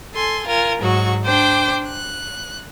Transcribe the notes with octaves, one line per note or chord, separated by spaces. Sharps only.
A4 G#5 C6
F4 A#4 G#5
G#2 F#3 F#4 C#6
D4 C5 G5 D6
F#6